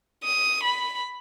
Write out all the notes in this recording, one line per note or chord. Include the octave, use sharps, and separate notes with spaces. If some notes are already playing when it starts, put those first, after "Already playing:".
D#6
B5